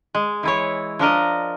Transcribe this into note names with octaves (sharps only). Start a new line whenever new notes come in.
G#3
E3 E4 C#5
F3 D4 A#4 D#5